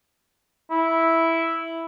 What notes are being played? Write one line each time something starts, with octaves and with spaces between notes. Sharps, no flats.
E4